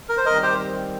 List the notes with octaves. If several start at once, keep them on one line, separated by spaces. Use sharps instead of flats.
A#4
C5
D#3 G3 C4 A#4 D#5
G4 C5